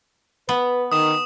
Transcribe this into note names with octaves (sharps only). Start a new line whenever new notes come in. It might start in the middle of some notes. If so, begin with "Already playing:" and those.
B3 B4
D#3 D#6 E7